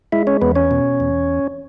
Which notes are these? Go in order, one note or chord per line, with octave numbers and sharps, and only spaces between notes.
G#3 E4 E5
C#4 C#5
E2 B3 B4
C#4 C#5
B2
E2